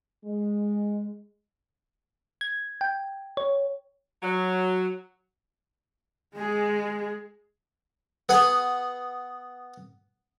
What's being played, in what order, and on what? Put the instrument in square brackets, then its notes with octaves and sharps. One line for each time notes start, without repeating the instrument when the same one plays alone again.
[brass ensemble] G#3
[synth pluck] G#6
G5
C#5
[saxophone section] F#3
[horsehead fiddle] G#3 G#4
[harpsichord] B3 G#4 F#5 G#5